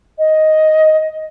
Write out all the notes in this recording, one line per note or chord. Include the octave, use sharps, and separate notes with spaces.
D#5